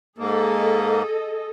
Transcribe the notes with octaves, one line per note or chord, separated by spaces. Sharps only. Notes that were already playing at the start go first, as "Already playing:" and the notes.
G#2 A#3 G#4 A4 D#5